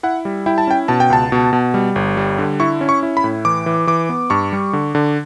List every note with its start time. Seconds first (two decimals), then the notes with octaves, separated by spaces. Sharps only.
0.03 E4 F#5
0.25 G3
0.46 E4 G5
0.58 A5
0.67 C#4 G5
0.88 B2 A5
1.00 G5
1.10 C#2 A5
1.32 B2
1.53 B2
1.74 G3
1.96 G1
2.17 G3
2.38 D3
2.60 E4 C#6
2.81 C#4
2.89 C#6
3.03 E4
3.17 B5
3.24 A2
3.45 E3 D6
3.66 E3
3.87 E3 D6
4.09 B3
4.30 G2 C#6
4.53 G3
4.73 D3
4.95 D3